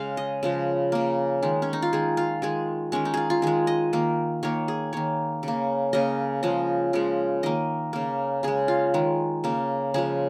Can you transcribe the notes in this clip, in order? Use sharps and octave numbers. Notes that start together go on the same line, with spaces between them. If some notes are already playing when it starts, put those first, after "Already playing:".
Already playing: C#3 G#3 F5
D#5
C#3 F3 G#3
C#3 A#3
D#3 G#3
C#4
D#4
F4
D#3 G#3 G#4
F4
D#3 G#3 G#4
D#3 G#3 C#4
D#4
F4 G#4
F4
D#3 G#3 G#4
D#5
D#3 A#3
D#3 A#3 C#5
G#4
D#3 A#3 C#5
C#3 A#3
C#3 A#3 D#5
C#3 F3 G#3 D#5
C#3 F3 G#3
D#3 A#3 D#5
C#3 A#3
C#3 G#3 G#4
F4
D#3 G#3
C#3 A#3
C#3 F3 G#3 G#4